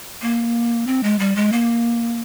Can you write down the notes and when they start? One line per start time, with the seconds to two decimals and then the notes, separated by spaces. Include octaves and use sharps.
0.22 A#3
0.87 C4
1.03 G#3
1.19 G3
1.36 G#3
1.52 A#3